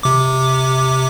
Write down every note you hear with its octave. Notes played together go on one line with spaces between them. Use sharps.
C3 D6